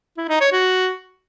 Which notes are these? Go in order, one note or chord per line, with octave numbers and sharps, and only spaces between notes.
E4
D#4
C#5
F#4